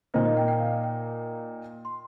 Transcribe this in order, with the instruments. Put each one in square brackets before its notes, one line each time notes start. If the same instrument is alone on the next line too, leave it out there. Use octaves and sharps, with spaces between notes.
[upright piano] A#2 A#3 D#4 [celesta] C5
[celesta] D#5
G5
G5
F5
G5
C6